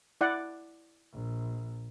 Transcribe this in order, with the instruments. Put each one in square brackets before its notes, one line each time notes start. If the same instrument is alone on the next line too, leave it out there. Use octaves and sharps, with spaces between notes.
[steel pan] E4 D5 F#5
[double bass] A#1